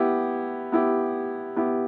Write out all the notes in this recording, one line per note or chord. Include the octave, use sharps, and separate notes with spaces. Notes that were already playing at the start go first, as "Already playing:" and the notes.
Already playing: B3 E4 G4
B3 E4 G4
B3 E4 G4